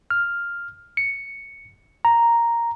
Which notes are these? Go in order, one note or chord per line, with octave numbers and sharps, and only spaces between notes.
F6
C#7
A#5